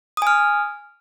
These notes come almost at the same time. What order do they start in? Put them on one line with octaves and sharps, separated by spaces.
D#6 G#5 F6